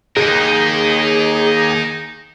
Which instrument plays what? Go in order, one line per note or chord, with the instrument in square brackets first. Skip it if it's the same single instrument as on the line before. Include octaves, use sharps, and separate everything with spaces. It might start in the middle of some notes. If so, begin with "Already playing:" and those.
[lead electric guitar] D#2 G#2 [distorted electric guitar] D#4 A#4 [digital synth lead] G#4